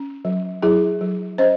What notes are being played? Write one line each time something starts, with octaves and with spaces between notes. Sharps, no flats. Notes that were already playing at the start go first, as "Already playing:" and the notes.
Already playing: C#4
F#3
F#3 E4 G#4
F#3
C#4 C5 D#5